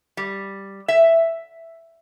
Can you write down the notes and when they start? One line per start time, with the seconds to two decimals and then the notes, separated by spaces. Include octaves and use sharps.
0.17 G3
0.88 E5